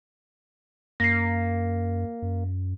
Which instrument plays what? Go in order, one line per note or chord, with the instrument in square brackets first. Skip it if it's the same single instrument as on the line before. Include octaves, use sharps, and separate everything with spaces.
[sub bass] F#2 [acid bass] A#3 [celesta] A#6 C7
[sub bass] F#2